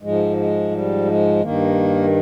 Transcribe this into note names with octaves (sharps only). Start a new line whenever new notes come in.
G#2 F3 G#3
G#3
G3
G#3
G2 D#3 A#3